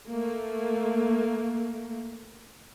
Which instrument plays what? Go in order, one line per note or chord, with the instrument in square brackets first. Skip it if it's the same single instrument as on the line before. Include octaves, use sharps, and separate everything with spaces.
[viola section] A3 A#3